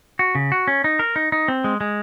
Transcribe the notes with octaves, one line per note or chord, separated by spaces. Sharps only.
F#4
C#3
F#4
C#4
D#4
A#4
D#4
D#4
C4
G#3
G#3